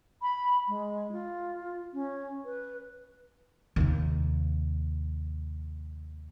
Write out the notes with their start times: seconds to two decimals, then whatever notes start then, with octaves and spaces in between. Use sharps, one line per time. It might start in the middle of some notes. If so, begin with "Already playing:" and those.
0.22 B5
0.68 G#3
1.12 F4
1.93 C#4
2.45 B4
3.76 D#2 C3